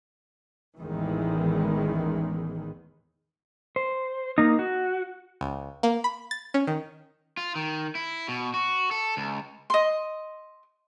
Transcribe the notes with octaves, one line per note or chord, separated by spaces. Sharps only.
A1 E2 D#3 E3 G#3
C5
A#3 D#4
F#4
C#2
A#3
B5
A6
C#4
D#3
F4
D#3
E4
B2
F#4
A4
C#2
D#5 C6